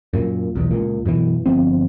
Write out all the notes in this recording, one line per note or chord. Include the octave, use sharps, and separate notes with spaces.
F#2 A#2
B1 E2
C#2 A#2
F#2 B2 E3
G1 F3 B3 C4